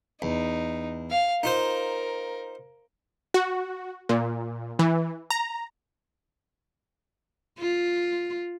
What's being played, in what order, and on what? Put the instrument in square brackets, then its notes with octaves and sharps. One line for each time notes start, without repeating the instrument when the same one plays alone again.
[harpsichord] E2 [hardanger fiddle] D#4
[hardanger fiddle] F5
[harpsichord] D#4 F4 C5 [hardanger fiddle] A#4
[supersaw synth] F#4
A#2
E3
A#5
[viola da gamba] F4